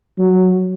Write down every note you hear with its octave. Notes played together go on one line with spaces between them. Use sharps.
F#3